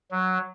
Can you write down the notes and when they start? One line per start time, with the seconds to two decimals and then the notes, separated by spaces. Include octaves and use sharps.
0.11 F#3